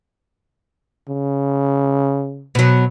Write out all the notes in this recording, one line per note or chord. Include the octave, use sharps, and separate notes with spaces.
C#3
B2 F#3